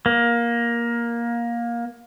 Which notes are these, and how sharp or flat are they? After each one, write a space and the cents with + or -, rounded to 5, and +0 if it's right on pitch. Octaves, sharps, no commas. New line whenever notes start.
A#3 +15